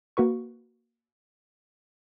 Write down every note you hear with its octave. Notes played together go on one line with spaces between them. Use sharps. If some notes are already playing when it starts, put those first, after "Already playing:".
A#3 F#4 B4 C#6